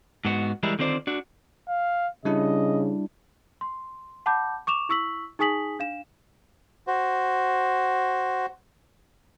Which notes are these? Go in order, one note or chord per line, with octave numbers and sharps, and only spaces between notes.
G#2 B3 F#4
E3 G3 G#3 E4 G#4 A#4
D3 D#3 C4 F4 C5 D5
D4 F#4
F5
C#3 G3 D4 E4 D#5
C6
F#5 A5 B5 D6 G6
C#6 D6 E7 F7
E4 C#6 E6 B6 F#7
D#4 G#4 G#5 D#6 B6 F#7
D4 F5 E7
F#4 C5